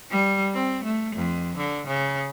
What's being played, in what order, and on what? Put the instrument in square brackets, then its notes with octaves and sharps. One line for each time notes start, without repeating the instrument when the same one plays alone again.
[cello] G3
C4
A3
F2
D3
C#3